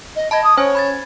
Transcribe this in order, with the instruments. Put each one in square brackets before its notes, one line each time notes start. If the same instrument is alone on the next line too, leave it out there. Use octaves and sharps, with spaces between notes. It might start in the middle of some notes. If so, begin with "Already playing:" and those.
[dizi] D#5
[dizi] D#5 [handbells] A5 B5 G#6
[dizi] D#6
[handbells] C#4 C5 G#5 [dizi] C#5
[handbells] B5 G#6 A6